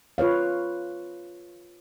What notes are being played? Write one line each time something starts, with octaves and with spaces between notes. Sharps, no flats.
F4 B4 C#5 F5